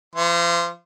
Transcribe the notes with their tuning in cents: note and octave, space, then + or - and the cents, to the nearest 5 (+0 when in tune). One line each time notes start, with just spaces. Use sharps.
F3 -35 C6 +0